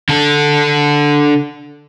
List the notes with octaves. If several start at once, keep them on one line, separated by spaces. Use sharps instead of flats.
D3 A4